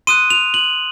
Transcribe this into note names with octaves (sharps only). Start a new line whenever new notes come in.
C6 D#6 F#6 D#7
F7
F#7